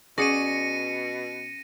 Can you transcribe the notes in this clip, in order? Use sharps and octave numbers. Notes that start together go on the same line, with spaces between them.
B2 C#4 F#4 G#4 D5 A#6 C#7 D#7